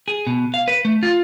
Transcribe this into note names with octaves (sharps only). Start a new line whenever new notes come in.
G#4
B2
F5
B4
A3
F4